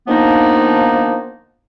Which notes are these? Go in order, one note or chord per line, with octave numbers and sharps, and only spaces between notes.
D#3 F3 A#3 B3 D4 D#4